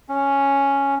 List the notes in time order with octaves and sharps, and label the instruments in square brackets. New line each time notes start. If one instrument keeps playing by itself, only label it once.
[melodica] C#4